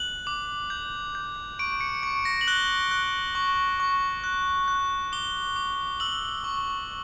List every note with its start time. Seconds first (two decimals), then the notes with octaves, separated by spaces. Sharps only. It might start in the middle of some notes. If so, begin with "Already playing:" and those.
Already playing: F#6 F#7
0.27 D6
0.70 G6
1.15 G6
1.59 C#6 D7
1.81 C#7
2.03 C#6 C#7
2.25 A#6
2.41 F#7
2.48 F#6 G7
2.91 F#6
3.35 C#6
3.80 C#6
4.24 F#6
4.68 F#6
5.12 D6 G7
5.56 D6
6.00 E6 F#7
6.44 C#6